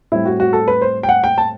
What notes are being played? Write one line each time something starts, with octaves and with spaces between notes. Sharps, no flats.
A2 G3 C4 E4
F#4
F#4
A4
B4
C5
G5
F#5
G5
A5